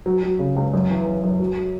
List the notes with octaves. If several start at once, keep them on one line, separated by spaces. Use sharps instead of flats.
F#3
F#3
C#3
C#2
F#2
E3
F#2
F#2
F#3
F#3